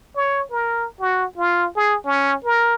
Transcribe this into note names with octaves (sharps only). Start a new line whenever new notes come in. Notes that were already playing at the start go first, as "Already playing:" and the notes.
C#5
A#4
F#4
F4
G#4
C#4
A#4